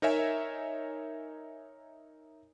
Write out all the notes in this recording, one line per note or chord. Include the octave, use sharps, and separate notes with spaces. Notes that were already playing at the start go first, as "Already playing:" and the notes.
D#4 A#4 C#5 E5 G#5